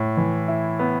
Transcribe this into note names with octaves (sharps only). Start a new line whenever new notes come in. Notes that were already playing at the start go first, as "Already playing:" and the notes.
Already playing: A2
E3
E4
B3